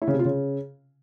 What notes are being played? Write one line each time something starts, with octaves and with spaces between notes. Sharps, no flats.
E4
C#3
C3
F4
C#3